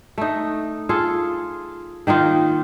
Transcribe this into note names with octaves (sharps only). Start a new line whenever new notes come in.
A3 D#4
F4 G#4 A4
D#3 A#3 D#4 F4